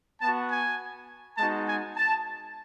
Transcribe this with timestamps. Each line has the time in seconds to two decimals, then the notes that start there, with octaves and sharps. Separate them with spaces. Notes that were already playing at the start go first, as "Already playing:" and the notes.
0.21 B3 F#4 A5
0.51 G#5
1.38 G#3 B3 D#4 F#4 A5
1.67 G#5
1.96 A5